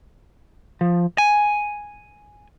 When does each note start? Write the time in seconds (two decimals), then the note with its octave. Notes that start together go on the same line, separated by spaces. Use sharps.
0.81 F3
1.18 G#5